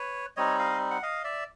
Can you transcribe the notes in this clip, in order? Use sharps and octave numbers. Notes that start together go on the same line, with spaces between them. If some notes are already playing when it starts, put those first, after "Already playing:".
Already playing: B4 C#5
G3 C4 D#4 C#5 D#5
D#5 F5
F#5
D#5 F5
D5 E5